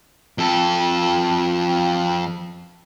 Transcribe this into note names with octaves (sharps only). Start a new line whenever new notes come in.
F2 A4